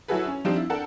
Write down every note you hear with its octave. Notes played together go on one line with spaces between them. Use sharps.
F#3 E4 F#4 G#4 A4 B4
C#4
F3 C4 D4 D#4 F4 G4
E4
D4 A4 A#4 F#5 G5 A5